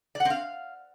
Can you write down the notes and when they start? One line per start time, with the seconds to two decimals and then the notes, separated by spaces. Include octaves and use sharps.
0.15 D5
0.20 F#5
0.25 C4
0.30 F5